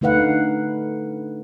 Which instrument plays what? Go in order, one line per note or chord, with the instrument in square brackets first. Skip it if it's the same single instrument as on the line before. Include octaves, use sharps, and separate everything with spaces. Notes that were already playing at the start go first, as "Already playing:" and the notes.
[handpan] D3 A3 D#4 B4 F5 F#5